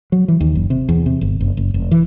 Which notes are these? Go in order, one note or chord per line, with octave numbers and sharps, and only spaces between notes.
F#3
E3
D#2
F#1
C3
E2
C3
G1
F#1
F#1
F1
E3